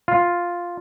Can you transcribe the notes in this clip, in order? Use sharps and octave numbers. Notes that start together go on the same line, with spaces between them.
F4